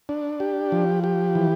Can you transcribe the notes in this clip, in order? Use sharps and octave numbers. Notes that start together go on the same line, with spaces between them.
D4
G4
F3
G4
E3